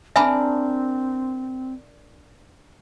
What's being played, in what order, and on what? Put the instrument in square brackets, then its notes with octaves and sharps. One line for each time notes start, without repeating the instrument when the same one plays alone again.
[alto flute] C4 [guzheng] D4 A#4 [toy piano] E5 G#5 B5